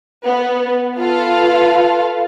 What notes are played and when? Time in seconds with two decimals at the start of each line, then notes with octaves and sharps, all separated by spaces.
0.25 B3
0.98 F4 A4 B4 F5